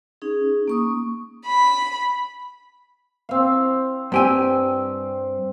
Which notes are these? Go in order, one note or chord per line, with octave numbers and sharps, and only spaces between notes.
C#4 D#4 G#4
A#3 C#6 D#6
B5
C4 F5
G2 C4 G4 G#5